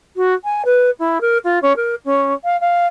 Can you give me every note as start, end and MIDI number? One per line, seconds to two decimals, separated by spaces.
0.16 0.33 66
0.44 0.62 80
0.65 0.90 71
0.99 1.18 64
1.21 1.38 70
1.44 1.59 65
1.62 1.72 61
1.76 1.95 70
2.04 2.33 61
2.44 2.59 77
2.60 2.87 77